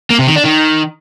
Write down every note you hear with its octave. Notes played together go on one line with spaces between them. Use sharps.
A#3
C3
D#3
D4
D#3